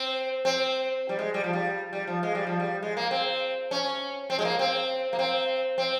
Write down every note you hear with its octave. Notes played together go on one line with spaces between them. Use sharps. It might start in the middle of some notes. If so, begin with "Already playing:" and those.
Already playing: C4
C4
G3
G#3
G3
F3
G3
G3
F3
G#3
G3
F3
G3
G#3
A#3
C4
C#4
C4
G#3
A#3
C4
A#3
C4
C4